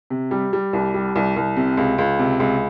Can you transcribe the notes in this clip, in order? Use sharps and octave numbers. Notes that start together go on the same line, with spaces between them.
C3
G3
G3
C2
G3
C2
C2
C3
C#2
C#2
C3
C#2